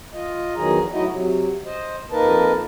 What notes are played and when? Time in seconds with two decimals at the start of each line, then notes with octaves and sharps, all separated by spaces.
0.13 F4 D#5
0.56 E2 D#3 F#3 G#4 A#5
0.92 F#3 A3 D#4 E4 F#4 D#5
1.09 C3 F#3
1.65 C5 D#5
2.11 F2 A#3 D#4 A#4 B4 A5